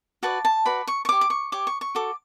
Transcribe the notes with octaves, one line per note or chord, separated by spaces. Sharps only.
F#4 B4 D5 A5
A5
F#4 B4 D5 B5
C#6
C#6
G4 C#5 D6
D6
C#6
G4 C#5 D6
C#6
C#6
F#4 A4 D6